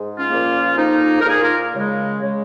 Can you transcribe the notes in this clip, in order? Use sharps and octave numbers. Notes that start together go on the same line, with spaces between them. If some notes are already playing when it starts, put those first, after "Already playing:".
Already playing: G#2 G#3
C#4 F4
A#2 F3 A#3
F2 F3 A#3 D#4
A#4
A#2 A#3 D#4 G#4
F4 A#4
C#3 G#3
C#3 G#3